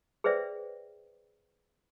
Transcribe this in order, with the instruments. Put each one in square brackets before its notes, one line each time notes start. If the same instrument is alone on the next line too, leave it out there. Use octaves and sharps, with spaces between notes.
[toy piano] G#4 B4 C5 D5 E5 G5